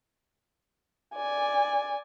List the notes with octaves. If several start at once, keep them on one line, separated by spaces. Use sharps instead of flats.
D5 G#5